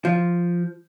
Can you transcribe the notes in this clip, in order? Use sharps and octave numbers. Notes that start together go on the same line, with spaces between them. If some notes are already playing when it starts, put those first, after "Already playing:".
F3